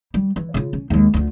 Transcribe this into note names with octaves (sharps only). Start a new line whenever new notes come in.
G3
E3
C#3 F4
C#4
D#2 G#3
D2 F4